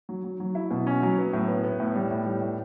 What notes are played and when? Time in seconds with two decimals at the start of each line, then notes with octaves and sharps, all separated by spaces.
0.09 F#3
0.24 F#3
0.40 F#3
0.55 E4
0.71 B2
0.87 C#4
1.03 F#3
1.18 B3
1.33 A2
1.48 B3
1.64 B3
1.80 A2
1.95 G3
2.11 A2
2.26 G3
2.42 A2